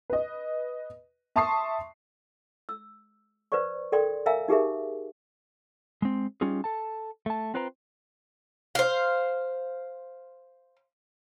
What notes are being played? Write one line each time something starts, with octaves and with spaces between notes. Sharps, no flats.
B4 D#5
E5 A5 C6 C#6 D#6 C7
E6
B4 C5 D5 C#6
A4 A#4 D5 G5 C6
A#4 E5 F5 G#5 A#5 E6
D#4 G4 G#4 A#4 E5
G#3 C4
G3 C#4 D#4 F4 G#4
A4 A5
A3 A5
C4 F4 B4 C5 G5 A#5
C5 F5